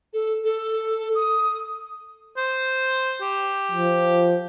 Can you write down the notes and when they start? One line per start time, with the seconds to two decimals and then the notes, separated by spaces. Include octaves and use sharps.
0.13 A4
0.44 A4
1.15 D#6
2.37 C5
3.22 G4
3.72 F3